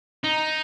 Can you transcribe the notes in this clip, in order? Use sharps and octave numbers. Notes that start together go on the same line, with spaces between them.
D#4